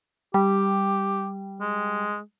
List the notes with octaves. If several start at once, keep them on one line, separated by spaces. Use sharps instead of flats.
G3 G4
G#3